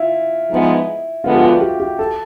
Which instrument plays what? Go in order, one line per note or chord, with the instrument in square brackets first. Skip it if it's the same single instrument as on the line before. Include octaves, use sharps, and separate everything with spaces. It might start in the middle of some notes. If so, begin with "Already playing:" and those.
Already playing: [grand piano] E4 F4
[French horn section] G#2 F3 G#3 B3
[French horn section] D3 F3 G#3 B3 [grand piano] F4
[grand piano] G4
F#4
G4
G4
A4